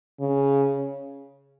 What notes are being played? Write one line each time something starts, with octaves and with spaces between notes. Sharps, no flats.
C#3